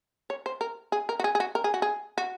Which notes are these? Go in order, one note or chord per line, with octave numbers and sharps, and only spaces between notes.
C#5
C5
A#4
G#4
A#4
F#4
G#4
G#4
F#4
A#4
G#4
F#4
G#4
F#4